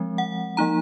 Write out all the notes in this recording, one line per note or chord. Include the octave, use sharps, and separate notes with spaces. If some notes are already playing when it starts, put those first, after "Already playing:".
Already playing: F3 G#3 C4
F#5
F3 A#3 D#4 A#5